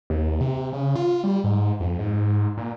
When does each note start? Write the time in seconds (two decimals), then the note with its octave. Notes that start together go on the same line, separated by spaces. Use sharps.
0.10 D#2
0.41 C3
0.73 C#3
0.95 F4
1.24 G3
1.44 G#2
1.80 F2
1.99 G#2
2.58 A#2